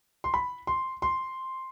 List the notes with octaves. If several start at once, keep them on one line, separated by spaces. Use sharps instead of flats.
C6
B5
C6
C6